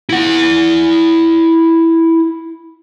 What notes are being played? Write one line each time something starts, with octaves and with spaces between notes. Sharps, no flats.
E4 F#5